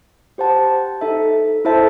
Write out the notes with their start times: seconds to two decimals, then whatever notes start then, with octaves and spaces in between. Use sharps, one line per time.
0.38 G4 C5 F#5 A5
1.01 D#4 A4 E5
1.65 E4 A4 C5 E5 A5